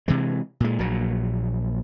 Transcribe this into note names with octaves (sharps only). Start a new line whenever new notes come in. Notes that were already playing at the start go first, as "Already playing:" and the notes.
C3 E3 G#3
A#2 G#3
A#1 A#2 F#3